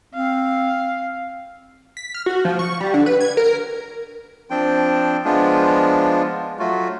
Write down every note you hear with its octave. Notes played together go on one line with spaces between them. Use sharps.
C4 F5
B6
F6
F#4
F3
C#6
G3
D3
B4
G#6
A#4
F3 C4 D4 G5
F3 G#3 B3 D4 F4
F#3 A3 F4 F#4